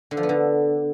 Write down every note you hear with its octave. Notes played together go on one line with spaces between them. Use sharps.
D3
F3
B3
D3